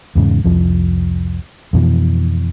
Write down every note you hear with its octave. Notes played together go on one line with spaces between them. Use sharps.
E2 G#2 C#3
C2 F2 F3
F2 B2 E3